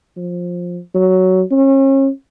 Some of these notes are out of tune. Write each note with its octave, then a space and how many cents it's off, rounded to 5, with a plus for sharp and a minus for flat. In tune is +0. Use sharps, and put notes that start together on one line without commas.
F3 +15
F#3 +10
C#4 -35